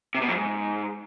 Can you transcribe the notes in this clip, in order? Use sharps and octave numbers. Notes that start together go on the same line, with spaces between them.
C3
B2
F2
G#2